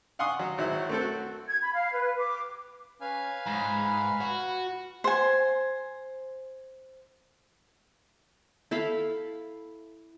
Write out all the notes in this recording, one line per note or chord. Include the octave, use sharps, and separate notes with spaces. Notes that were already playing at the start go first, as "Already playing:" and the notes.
F5 F#5 G#5 C6 C#6 D#6
F#3
G#1 F#3 E4
A3 C4 A4
F#4
G#6
B5
F5
B4
D6
C#4 B4 F5 G#5
G#2 B5
F#4
C5 G#5
E4 A4 F5 B5